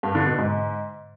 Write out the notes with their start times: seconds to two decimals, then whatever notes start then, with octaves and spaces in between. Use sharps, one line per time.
0.03 G2
0.15 D3
0.27 B2
0.38 G#2